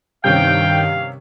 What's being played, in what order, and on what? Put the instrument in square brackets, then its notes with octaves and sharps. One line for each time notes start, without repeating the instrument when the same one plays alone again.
[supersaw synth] G2 D#3 [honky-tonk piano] C3 C4 C#4 [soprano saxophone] F5 [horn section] G5